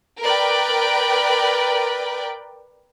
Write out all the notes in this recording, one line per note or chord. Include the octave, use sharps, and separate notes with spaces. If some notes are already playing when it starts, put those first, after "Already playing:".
A#4 B4 D5 G5